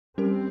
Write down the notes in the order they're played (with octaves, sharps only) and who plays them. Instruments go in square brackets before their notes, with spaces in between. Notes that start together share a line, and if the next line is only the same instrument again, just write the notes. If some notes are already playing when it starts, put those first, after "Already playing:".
[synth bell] G3 C#4 G4 A#4 [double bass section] C4